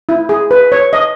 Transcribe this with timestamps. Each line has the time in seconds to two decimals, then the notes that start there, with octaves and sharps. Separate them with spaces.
0.09 E4
0.29 G#4
0.51 B4
0.72 C#5
0.93 D#5